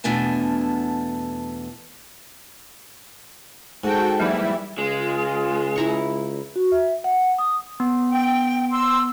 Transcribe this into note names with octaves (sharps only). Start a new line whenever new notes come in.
E2 B2 A3 D4 G#5 A5
G#2 F#4 A4 G5 A5
E3 F#3 G3 A#3 D#4 E4 E5
C#2 G#3 F4
E4 A#5 C#6
F#4
E5
F#5
D#6
B3
G5
C6 E6